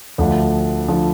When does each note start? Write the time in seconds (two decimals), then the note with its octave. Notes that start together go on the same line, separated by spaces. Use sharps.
0.18 D2 D3 F3
0.88 D3 F3